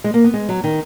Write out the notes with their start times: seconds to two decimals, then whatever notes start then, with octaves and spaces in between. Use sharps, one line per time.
0.04 G#3
0.14 A#3
0.24 B3
0.34 G#3
0.49 F#3
0.64 D#3